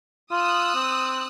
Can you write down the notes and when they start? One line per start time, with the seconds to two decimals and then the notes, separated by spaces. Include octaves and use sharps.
0.31 F4 D#6 E6 F#6
0.75 C4